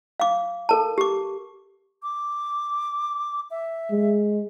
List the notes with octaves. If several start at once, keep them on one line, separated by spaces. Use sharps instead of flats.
F5 D6
A4 A#4 A5
G4 D6
D6
E5
G#3